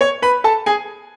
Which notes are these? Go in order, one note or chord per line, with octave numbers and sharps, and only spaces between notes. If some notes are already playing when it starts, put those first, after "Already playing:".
C#5 C#6
B4 B5
A4 A5
G#4 G#5